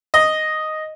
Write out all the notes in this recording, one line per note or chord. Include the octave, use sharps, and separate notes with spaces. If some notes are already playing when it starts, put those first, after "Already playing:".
D#5